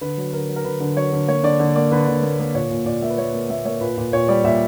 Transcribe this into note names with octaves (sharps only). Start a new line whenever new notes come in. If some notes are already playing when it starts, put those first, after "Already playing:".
D3 B4
F#3
D3 A#4
F#3
A#4
D3 B4
D3
F#3 C#5
D3
A#3 C#5
D3 D5
D3
A#3 D5
D3 B4
D3
A#3
A#3
A#2 C#5
A#2
A#2 D5
A#3 E5
B4
A#3 C#5
A#3
A#3 E5
A#3 C#5
A#2 B4
A#2
A#2 C#5
G3 D5
A#2 E5